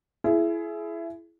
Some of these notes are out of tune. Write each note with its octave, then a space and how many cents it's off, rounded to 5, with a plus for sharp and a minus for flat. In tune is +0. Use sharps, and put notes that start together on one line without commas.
E4 +25 G#4 +30